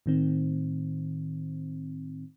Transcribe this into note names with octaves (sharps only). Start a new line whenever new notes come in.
A2 D#3 C4